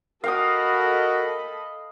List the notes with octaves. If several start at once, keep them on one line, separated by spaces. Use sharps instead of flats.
F#4 A4 A#4 D#5 F5 G5 B5 D#6